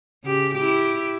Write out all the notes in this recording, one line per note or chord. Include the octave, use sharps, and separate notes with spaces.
C#3 G4
E4 G4